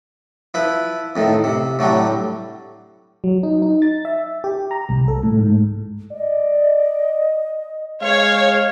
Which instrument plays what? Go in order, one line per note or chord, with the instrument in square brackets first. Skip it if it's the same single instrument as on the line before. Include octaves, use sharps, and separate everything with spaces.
[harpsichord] F3 E4 B4
F2 A2 D#3
C3
A2 D3 F#3 G3
[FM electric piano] F#3
D#4
D#4
A6
E5
G4
A#5
C2
A4
A2
G#2
[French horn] D5 [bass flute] D#5
[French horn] G#3 [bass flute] G#4 [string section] C#5 [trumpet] F5